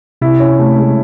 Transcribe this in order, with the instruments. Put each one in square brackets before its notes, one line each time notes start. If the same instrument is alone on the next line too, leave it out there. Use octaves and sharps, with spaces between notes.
[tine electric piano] C3 [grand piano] E4
[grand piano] C#4
[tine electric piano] C3 [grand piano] A3
[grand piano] G#3